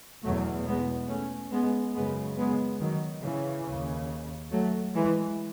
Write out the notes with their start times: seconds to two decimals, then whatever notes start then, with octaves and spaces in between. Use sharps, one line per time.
0.23 E2 B2 F#3 A3
0.66 G#3 B3
1.08 A3 C#4
1.51 G#3 B3
1.94 F#2 C#3 G#3 B3
2.37 G#3 B3
2.80 D#3 F#3
3.22 C#3 E3
3.66 D#2 C#3
4.51 F#3 A3
4.94 E3 G#3